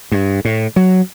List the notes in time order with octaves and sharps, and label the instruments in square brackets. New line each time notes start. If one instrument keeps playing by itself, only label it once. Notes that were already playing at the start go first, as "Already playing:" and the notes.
[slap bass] G2
A2
F#3